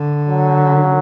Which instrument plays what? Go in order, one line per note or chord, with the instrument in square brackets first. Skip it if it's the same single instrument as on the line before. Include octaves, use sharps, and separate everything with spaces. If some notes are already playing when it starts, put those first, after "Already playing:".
Already playing: [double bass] D3
[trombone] F#3